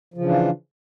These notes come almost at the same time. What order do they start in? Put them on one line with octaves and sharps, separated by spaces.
F3 C#3 E3 D4 F4